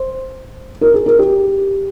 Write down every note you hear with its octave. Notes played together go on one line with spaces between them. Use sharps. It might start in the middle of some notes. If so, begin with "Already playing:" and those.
Already playing: C5
A#4
G#4
A#4
G4